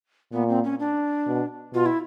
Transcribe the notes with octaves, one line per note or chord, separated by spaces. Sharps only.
A#2 B3
C4
C#4
D4
B2
B2 F4
E4